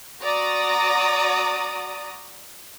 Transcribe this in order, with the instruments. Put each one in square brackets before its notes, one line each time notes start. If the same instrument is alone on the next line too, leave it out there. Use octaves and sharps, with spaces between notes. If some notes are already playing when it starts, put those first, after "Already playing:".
[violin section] F#4 D5 A#5 D#6